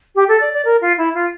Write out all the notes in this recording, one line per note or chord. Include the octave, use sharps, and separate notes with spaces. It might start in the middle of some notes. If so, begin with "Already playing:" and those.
G4
A4
D5
D5
A#4
F4
E4
F4